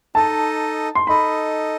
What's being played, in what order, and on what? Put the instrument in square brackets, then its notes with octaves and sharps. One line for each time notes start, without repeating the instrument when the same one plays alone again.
[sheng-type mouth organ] D#4 A4 D#5 [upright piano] A5
[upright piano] C6
[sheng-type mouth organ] D#4 A4 D#5 [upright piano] B5